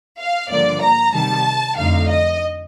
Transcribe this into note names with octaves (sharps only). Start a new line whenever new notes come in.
F5
G2 D3 F3 A#3 D5
A#5
C3 D#3 G3 A5
F2 D3 A3 D#4 F5
D#5